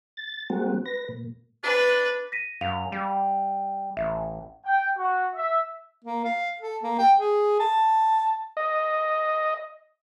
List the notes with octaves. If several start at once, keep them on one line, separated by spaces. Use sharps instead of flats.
A6
G3 G#3 A#3 C4 F#4
B4 A#6
A#2
D4 B4
A#6 B6 D#7
F#2 F5 F7
G3
A1 E5
G5
F#4
E5
A#3
F5
A4
A#3
G5
G#4
A5
D#5